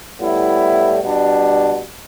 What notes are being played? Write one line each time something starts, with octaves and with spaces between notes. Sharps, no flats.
A2 G3 B3 E4
B2 G3 D4